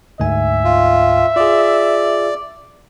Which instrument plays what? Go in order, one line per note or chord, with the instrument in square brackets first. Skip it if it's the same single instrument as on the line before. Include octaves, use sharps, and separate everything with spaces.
[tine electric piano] D2 G#2 G#5 [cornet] E5
[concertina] F4
[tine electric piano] F4 G#4 [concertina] D5